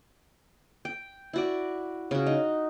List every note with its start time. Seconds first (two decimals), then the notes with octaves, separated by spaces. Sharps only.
0.85 G5
1.33 E4 F#4 D5
2.11 C#3 F#4
2.26 D#4